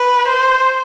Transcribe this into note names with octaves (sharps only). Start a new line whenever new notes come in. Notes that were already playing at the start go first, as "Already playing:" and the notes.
Already playing: B4
C5